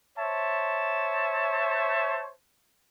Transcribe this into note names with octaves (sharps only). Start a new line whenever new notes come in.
C5 C#5 E5 A5